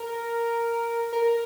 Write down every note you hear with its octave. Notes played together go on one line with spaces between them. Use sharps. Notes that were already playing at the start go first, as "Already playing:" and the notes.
Already playing: A#4
A#4